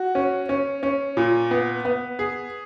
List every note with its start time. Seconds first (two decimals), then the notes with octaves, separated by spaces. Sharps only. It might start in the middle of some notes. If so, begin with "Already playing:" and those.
Already playing: F#4
0.15 C#4
0.49 C#4
0.83 C#4
1.17 A#2
1.51 B3
1.85 B3
2.19 G#4